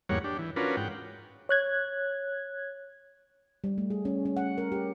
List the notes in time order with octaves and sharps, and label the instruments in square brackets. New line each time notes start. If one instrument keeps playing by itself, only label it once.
[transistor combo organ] E2 G#2 G3 A#3 C#5 F#5
D4 G4
E3
C#4 D4 F4 F#4 A#4 B4
G#2 F#5 G5
[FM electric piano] C#5 F#6 G#6
[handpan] G3
A3
G#4
C#4
C#4
F#5
A#4
G4